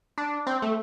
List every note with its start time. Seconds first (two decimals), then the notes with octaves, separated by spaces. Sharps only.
0.18 D4
0.47 C4
0.62 A3